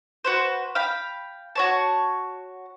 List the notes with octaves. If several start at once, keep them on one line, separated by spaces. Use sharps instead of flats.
F#4 B4 C5
F5 G5 B5
F#4 C#5 A5